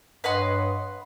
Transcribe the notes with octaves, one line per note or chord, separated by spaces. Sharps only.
G2 B4 C#5 D#5 F#5 C6